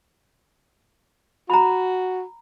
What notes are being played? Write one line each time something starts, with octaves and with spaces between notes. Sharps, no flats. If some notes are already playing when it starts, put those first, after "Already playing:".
F#4 A#5 B5